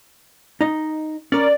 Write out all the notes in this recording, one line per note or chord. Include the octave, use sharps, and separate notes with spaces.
D#4 D#5
C#4 A#4 D5